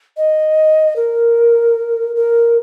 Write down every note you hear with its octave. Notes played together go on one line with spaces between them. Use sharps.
D#5
A#4
A#4